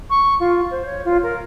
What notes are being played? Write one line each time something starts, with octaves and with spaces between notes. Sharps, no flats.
C#6
F4
C5
C#5
F4
A#4